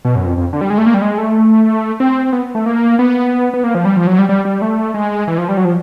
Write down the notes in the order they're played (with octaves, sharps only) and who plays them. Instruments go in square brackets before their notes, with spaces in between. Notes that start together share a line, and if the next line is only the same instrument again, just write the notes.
[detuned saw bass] B2
F#2
F2
F2
D3
G3
G#3
A3
A#3
G3
G#3
A3
C4
B3
A3
A#3
B3
B3
A#3
F3
G3
F3
F#3
G3
G3
G3
A3
G#3
E3
F3
G3
F#3
F3